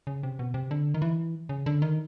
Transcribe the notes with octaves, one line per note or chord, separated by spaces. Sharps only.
C#3
C3
B2
C3
D3
D#3
E3
C#3
D3
D#3